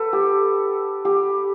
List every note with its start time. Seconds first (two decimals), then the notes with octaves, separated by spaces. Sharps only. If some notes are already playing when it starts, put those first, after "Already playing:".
Already playing: A4 B4
0.13 G4
1.05 G4